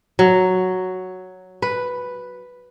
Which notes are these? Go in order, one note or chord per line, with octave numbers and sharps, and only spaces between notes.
F#3
B4